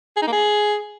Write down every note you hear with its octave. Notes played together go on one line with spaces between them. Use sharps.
G#4
D#4
A#3
G#4